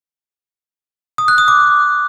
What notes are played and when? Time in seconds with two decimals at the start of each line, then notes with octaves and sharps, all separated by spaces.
1.18 D#6
1.28 F#6
1.38 D#6
1.48 D6